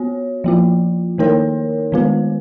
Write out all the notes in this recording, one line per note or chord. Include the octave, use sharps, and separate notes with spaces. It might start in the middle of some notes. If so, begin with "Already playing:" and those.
Already playing: B3 F#4 C#5
F3 A#3 F4
D#3 A#3 D#4 A#4 C#5
D#3 G#3 B3 F4 B4